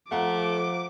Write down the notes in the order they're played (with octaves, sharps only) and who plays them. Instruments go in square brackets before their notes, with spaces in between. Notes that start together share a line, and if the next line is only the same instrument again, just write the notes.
[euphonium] F3 [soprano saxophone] A3 [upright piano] F5 F#5 A#5 [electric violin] D6